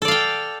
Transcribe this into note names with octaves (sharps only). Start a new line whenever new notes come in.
A4 D5 F5 G5